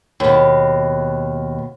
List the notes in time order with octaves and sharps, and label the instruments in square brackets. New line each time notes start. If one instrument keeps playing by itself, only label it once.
[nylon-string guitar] D#2 B2